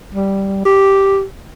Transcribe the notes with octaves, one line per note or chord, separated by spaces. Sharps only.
G3
G4